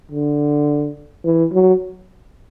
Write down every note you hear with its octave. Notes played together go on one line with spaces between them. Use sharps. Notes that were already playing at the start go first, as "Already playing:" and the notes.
D3
E3
F#3